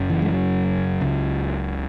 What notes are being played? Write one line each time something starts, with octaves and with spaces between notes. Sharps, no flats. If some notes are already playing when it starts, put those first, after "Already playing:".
Already playing: F#1 F#2 C#3
E3
G#3
F#3
C#2 C#3